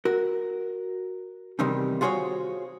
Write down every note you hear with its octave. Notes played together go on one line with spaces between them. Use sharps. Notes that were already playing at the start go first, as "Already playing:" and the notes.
F#4 A#4
E2 G2 C3 D#3 G3 D#4
F4 F#4 G#4 C5 C#5 F5